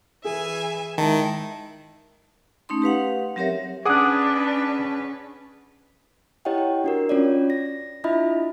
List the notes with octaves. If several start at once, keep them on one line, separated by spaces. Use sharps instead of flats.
E3 G#4 E5 G#5
D#3 G#3 E4 A5
A3 C#4 D#4 C6
G4 B4 F5 F#5
F#3 C4 G4 A#4 C#5 E5
C#4 D4 G#4 B4 F#5 D6 D#6 F#6
E4 G4 C#5 D#5 F#5 G5
G4
D4 F#4 A#4
C#4 F4 C#5 D5
A#6
D4 E4 F4 D#5 E5 B5